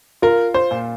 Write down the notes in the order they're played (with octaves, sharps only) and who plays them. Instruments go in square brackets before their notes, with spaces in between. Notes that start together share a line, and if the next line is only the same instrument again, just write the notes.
[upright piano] F4 [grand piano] A#4
[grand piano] C5
[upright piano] A#2